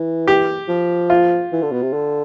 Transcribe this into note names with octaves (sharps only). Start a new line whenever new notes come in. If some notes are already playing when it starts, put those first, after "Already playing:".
Already playing: E3
G4
F3
F4
E3
D3
B2
C3
D3